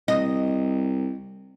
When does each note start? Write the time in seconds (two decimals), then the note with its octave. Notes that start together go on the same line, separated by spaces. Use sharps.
0.08 C2 D#5